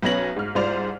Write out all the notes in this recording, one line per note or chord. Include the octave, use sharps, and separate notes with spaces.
B1 B3 C#4 C#5 A#6 F#7
G#2 F6
C2 G#2 F4 C5 D5 F7